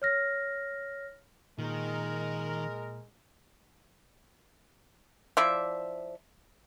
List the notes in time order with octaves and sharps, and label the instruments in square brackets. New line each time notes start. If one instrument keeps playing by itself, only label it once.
[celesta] C#5 F6 A#6
[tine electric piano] A#2 [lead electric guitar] D#3 [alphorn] G#3 [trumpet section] A#4
[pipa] F3 E4 D5 E5